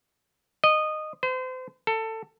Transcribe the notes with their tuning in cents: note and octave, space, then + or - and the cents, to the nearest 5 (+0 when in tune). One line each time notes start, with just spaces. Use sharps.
D#5 -15
C5 -35
A4 +20